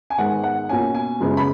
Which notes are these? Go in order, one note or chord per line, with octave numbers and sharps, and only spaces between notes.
G#5
G#2 D#3 G#3 B3 F#5
F#5
B2 A#3 C#4 G#5
G#5
F#2 C#3 G#3 B3
B5